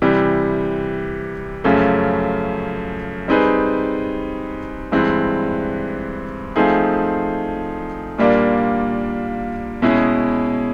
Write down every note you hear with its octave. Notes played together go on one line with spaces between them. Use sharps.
C3 E3 G3
F#2 C#3 F3 A3 C#4
G3 C4 D#4 G#4 B4
G2 E3 G#3 C4
F3 A3 C4 D#4 G#4
A#2 G3 A#3 D4 F4
B2 G#3 C#4 E4 G#4